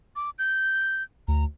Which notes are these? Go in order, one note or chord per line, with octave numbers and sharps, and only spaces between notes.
D6
G6
D2 A#5